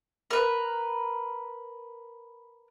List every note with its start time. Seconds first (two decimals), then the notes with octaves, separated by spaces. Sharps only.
0.31 A#4 B4